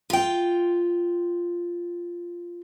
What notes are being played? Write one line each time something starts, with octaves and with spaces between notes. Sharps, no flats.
F4 G5